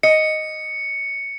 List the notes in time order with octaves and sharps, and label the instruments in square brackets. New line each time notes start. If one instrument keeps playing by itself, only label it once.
[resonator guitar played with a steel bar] D#5 [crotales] C#7